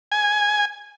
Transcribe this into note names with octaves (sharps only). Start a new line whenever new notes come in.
G#5